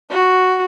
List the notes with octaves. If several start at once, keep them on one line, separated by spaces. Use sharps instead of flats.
F#4